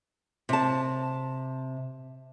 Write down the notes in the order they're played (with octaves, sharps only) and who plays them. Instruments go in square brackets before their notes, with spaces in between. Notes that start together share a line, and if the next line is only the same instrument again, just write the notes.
[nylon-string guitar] C3 A5